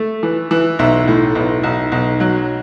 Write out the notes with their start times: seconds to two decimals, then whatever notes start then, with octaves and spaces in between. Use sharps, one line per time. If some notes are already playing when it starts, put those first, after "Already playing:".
Already playing: A3
0.23 E3
0.51 E3
0.79 B1 E5
1.08 A2
1.35 B1
1.63 B1
1.92 B1
2.20 F#3